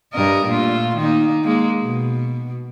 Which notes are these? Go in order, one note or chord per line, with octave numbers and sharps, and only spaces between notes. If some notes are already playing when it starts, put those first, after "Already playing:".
G2 A#4 D#5
A#2 A3 F4
D#3 A#3 D#4
G#3 A#3
B2